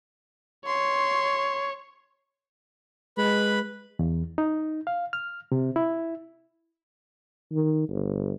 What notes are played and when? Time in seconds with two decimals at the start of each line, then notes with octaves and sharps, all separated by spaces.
0.67 C#5 C6
3.18 G#3 B4 B5
3.99 E2
4.38 D#4
4.87 F5
5.13 F6
5.52 C3
5.76 E4
7.52 D#3
7.89 G1